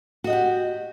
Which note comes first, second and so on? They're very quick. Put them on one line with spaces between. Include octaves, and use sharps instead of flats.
F#4 D#5 F#5 G4